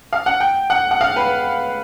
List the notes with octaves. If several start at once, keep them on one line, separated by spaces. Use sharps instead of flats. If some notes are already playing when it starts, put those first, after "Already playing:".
F5
F#5
G5
F#5
F#5
F5
B4